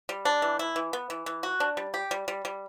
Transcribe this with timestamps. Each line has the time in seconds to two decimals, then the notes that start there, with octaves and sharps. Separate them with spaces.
0.09 G3
0.25 D4
0.42 E3
0.59 E4
0.76 E3
0.93 B3
1.10 E3
1.26 E3
1.43 F#4
1.60 D4
1.77 G3
1.94 G4
2.11 G3
2.28 G3
2.45 G3